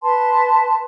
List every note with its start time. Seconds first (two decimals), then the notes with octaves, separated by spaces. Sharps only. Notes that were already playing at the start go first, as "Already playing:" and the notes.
0.03 B4 A5 C6